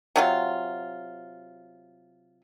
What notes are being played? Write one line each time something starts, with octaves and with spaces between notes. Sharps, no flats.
C3 F#3 F4